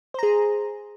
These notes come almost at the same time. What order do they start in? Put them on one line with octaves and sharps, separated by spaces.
C5 A#5 G#4